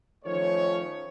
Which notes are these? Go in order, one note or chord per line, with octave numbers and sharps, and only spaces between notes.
D#3 F3 A3 C#4 C#5